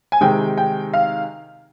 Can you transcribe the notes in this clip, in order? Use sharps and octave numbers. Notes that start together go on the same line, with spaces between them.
G#5
C3 D#3 G#3 G5
G5
F5